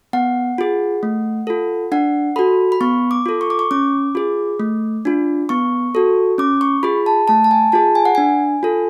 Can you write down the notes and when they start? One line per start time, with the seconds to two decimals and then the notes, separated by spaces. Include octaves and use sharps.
0.13 B3 F#5
0.58 F4 G#4
1.03 A3
1.47 F4 A4
1.92 D4 F#5
2.36 F#4 A4 B5
2.72 B5
2.81 B3 C#6
3.11 D6
3.26 F4 A4
3.41 C#6
3.50 D6
3.59 C#6
3.71 C#4 D6
4.15 F4 G#4
4.60 A3
5.05 D4 F4
5.49 B3 C#6
5.95 F#4 A4
6.38 C#4 D6
6.61 C#6
6.83 F4 G#4 B5
7.06 A5
7.28 A3 A5
7.44 A5
7.51 G#5
7.72 F4 G#4 A5
7.95 G#5
8.05 F#5
8.15 D4 G#5
8.63 F4 A4